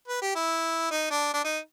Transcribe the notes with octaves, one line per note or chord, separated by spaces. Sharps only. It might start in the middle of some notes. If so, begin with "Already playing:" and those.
B4
G4
E4
D#4
D4
D4
D#4